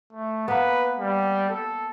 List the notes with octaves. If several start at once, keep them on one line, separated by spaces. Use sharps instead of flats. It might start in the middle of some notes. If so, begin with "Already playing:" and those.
A3
A#3 B3 B4
G3
A4